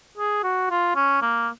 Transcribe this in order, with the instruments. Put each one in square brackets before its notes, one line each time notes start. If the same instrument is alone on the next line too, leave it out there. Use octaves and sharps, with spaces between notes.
[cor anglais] G#4
F#4
F4
C#4
A#3